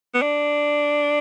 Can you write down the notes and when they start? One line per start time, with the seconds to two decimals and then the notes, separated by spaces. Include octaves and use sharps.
0.14 B3
0.22 D4